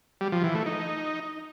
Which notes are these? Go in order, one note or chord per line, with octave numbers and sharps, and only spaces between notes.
G3
F3
E3
A3
D#4